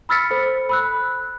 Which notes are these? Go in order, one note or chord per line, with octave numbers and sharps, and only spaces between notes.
B5 E6 F6 A6 B6 C#7
A4 C5
B5 E6 F#6